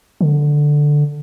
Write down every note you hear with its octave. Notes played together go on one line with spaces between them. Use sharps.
D3